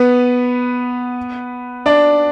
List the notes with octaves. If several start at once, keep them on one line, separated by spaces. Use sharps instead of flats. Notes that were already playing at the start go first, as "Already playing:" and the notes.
Already playing: B3 B4
D4 D5